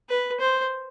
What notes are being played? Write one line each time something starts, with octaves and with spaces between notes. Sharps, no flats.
B4
C5